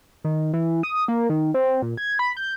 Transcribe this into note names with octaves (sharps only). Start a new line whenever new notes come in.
D#3
E3
D#6
A#3
D#3
C4
A#2
G#6
B5
G6